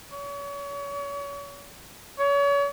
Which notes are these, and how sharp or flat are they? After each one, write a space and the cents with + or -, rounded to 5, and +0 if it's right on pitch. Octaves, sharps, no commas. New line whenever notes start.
C#5 +35
C#5 +35